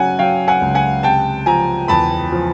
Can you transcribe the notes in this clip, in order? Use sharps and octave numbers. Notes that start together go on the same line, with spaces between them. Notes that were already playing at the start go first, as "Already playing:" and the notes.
Already playing: C#3 F#3 F#5 G#5
F#3 F5 G5
F#5 G#5
C#2
F#5 G#5
C3 G5 A5
F3 G#5 A#5
E2 A5 B5
F3